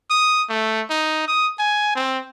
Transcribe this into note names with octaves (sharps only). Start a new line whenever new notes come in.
D#6
A3
D#4
D#6
G#5
C4